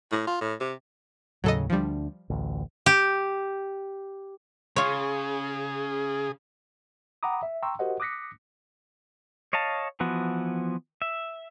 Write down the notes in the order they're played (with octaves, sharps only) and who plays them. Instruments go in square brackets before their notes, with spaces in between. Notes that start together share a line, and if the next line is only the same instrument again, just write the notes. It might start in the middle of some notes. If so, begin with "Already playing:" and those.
[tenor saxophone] A2
F4
A2
C3
[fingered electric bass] D#2 A2 C#3 [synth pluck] F#3 A4 D#5
[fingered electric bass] D2 D4 [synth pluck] F3 G3
[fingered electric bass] A1 D2
[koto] G4
[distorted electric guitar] C#3 [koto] F4 C#5 [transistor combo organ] G#4
[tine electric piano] F#5 G5 A#5 B5 D6 D#6
E5
G5 A#5 C6 C#6 E6
F#4 G4 A#4 C5 D#5 F#5
D6 D#6 F#6 A#6 B6 C#7
[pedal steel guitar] C#5 D#5 F5 A5
E3 F3 B3 F#4
E5